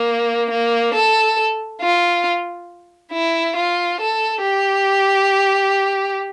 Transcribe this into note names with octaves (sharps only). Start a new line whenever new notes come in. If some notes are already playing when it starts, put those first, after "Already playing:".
Already playing: A#3
A#3
A4
F4
E4
F4
A4
G4